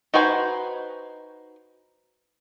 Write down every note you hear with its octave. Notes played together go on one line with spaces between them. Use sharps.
D#4 F#4 B4 C5 G#5